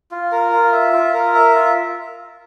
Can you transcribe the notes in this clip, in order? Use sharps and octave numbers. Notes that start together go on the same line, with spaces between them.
F4
A#4
F4
E5
F4
A#4
E5
F4